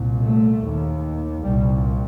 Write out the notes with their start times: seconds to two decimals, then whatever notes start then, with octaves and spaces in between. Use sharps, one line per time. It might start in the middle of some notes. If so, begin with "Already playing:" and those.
Already playing: C2 A#2
0.23 A3
0.63 D#2
1.43 C2 A#2 G3